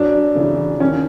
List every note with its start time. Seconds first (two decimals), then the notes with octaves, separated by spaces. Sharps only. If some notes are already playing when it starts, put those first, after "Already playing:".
Already playing: F#2 D4
0.35 C#3 E3
0.80 D#2 C#4